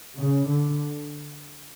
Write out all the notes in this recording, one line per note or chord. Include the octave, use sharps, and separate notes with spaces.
C#3
D3